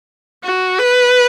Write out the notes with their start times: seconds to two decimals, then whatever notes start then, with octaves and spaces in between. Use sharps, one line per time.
0.44 F#4
0.79 B4